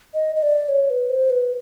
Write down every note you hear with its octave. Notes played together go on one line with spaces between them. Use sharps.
D#5
D#5
D5
C#5
B4
C5
B4